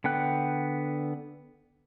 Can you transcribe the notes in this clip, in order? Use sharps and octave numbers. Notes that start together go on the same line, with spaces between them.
D3 B3 G5 F#6